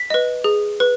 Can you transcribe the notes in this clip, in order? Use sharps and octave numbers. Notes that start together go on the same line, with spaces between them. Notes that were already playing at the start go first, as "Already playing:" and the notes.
Already playing: B6
B4 D#5
G#4
B4